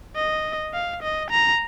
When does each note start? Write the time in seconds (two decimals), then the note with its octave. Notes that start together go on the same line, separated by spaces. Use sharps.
0.16 D#5
0.74 F5
1.03 D#5
1.31 A#5